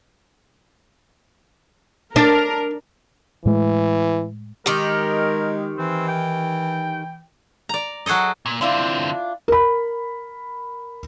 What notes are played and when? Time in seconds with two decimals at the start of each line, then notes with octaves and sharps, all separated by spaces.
2.16 D4 A#4
3.46 A2 E3 G#3 A3
4.66 D#3 G#3 G4 A#4
5.77 E3 C4
6.08 G5
7.69 D5 A#5
8.06 F#3 F#4 G#4 A4 D#5
8.46 A#2
8.61 D3 C4 D4 E4 F4
9.48 A#4 B5